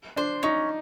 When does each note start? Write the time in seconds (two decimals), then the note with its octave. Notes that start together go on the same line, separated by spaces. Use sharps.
0.16 D4 C5
0.43 C#4 D#4